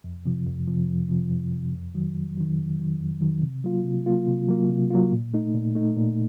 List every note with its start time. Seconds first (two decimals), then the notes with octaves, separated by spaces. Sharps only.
0.04 F2
0.26 C3 F3
0.46 F2
0.67 C3 F3
0.89 F2
1.10 C3 F3
1.31 F2
1.51 C3 F3
1.73 F2
1.94 D#3 F#3
2.15 F2
2.37 D#3 F#3
2.58 F2
2.80 D#3 F#3
3.01 F2
3.21 D#3 F#3
3.43 C3
3.64 F#3 A#3 F4
3.85 C3
4.06 F#3 A#3 F4
4.27 C3
4.49 F#3 A#3 F4
4.70 C3
4.91 F#3 A#3 F4
5.12 A#2
5.34 A3 D#4
5.54 A#2
5.75 A3 D#4
5.96 A#2